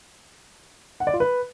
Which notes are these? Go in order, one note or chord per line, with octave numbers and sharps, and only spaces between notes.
F#5
D5
F4
B4